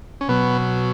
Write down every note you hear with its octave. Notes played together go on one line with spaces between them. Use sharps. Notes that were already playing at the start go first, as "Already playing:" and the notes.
C#4
B2 F#3 B3